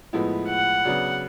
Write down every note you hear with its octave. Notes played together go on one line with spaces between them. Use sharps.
A2 F3 G#3 B3 E4
F#5
C#3 F#3 B3 D4